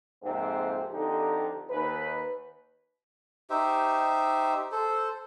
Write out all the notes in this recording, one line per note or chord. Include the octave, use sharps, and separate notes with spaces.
F2 G#2 C3 A#3 C4
F2 D3 D#4 G4
D#2 B4
D#4 G4 C5 E5
A4 C5